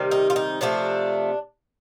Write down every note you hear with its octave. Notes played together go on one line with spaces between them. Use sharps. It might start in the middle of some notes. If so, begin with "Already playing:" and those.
Already playing: C3 D#3 G3
D#4
F4
D#4
C3 F3 A3 D4